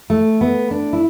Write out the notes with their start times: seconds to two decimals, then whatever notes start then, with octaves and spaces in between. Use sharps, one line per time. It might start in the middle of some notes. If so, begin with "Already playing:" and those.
0.10 A3
0.41 B3
0.71 D4
0.93 E4